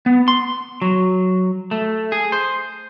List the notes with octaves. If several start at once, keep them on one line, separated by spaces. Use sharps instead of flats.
B3
C6
F#3
A3
G#4
C5